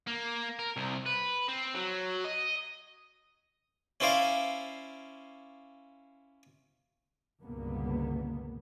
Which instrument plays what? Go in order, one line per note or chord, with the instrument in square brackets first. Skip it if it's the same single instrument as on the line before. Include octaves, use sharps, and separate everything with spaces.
[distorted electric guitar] A#3
A#4
C2
B4
C4
F#3
D#5
[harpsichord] C#4 E4 C5 D5 F5
[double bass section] G1 C#2 G2 B2 A#3 B3